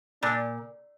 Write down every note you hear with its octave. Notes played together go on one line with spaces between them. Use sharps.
A#2 D4